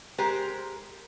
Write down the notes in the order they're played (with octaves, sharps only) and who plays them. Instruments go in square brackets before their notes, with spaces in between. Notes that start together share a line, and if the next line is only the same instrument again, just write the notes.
[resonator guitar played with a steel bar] G#3 G4 A#4 C5